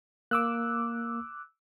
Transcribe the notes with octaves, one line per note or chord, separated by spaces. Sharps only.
A#3 D6 E6 F#6